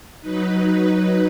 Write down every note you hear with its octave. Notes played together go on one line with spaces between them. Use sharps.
F#3 D#4 B4